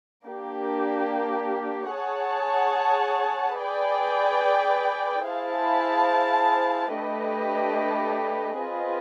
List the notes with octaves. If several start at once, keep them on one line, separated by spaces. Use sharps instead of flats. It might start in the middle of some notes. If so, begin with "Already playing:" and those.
A#3 D4 G4
G#4 C#5 F#5 A5
G#4 B4 D5 G5
E4 G#4 C5 F5 A5
A3 D4 G4 B4 D#5
C4 F4 G#4 B4 D#5